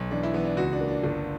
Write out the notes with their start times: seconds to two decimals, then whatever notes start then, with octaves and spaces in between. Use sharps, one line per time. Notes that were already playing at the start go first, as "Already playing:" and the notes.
Already playing: B1
0.11 E3 D4
0.23 E4
0.34 E3 B3
0.45 D4
0.57 C#2 F#4
0.73 D4
0.81 A#3
0.88 D4
1.03 G1